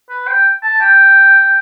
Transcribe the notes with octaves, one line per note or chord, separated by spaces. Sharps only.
B4
G5
A5
G5